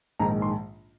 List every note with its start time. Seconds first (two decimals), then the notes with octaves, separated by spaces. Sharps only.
0.19 A#1 G#2 D#3 A#5
0.42 C6